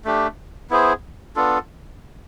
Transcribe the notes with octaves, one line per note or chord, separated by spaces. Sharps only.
A3 D4 G4
B3 E4 G#4 C5
B3 D4 F4 A4